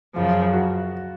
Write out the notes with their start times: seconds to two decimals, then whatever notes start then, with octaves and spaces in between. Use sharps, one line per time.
0.16 F#2 C#3 F3 F4
0.53 F#4